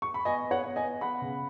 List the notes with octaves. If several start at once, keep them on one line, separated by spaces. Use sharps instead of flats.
C#6
B5
B3 D#5 G#5
B3
C#5 F#5
B3
D#5 G#5
B3
B3 F#5 B5
C#3